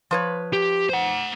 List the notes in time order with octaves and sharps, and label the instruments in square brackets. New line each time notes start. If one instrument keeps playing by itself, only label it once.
[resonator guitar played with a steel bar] F3 B4 C#5
[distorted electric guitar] G4
C5 F#5